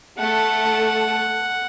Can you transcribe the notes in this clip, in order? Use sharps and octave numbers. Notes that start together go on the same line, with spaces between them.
A3 A4 F#5